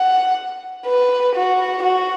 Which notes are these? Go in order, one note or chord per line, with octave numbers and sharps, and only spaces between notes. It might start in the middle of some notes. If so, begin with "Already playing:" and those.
Already playing: F#5
B4
F#4
F#4